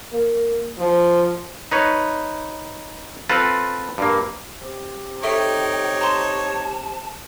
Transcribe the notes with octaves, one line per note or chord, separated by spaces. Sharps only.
A#3
F3
D#4 B4 C#5
C4 F4 A4 B4
G2 A#3
C3
D#4 A4 C#5 E5 G5 C#6
A5 A#5 C6